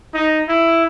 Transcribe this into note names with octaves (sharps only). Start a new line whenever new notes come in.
D#4
E4